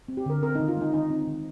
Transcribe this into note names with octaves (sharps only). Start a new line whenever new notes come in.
C4
G4
D3 A#4
C4 A#4
D#3 D#4
F4
G#3 D#4
D#3 D#4
C4
D#3